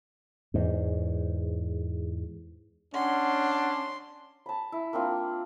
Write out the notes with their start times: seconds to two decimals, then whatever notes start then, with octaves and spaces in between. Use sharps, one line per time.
0.54 E2 G#2
2.94 C#4 D4 F#5 C6
4.46 A5 B5
4.72 E4
4.93 A#3 C4 D4 F4